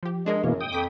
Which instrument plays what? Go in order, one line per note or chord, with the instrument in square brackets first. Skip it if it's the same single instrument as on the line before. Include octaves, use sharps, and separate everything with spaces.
[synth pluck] F3 G4
[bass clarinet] G#3 [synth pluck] D4 G#4 A#4
[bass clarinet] F#2 [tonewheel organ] B2 E3 A#3 [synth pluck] C#5
[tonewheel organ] G5 D#6
[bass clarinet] F2 [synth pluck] D6 B6